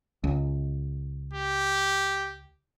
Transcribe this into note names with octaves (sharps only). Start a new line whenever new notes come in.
C#2
G4